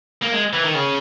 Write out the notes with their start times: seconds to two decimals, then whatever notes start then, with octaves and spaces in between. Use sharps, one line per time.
0.22 A#3
0.32 G#3
0.53 E3
0.64 D#3
0.75 C#3